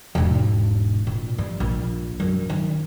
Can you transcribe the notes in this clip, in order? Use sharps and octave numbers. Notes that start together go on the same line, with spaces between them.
E1 G#2
A#2
G3
A#1
F#2
D#3